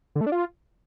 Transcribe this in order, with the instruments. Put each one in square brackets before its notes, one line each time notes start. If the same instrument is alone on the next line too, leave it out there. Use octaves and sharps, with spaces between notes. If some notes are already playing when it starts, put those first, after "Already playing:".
[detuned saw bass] D3
A3
D4
F4